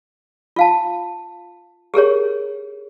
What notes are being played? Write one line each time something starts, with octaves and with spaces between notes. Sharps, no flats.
F4 F5 A5
G4 G#4 A#4 C#5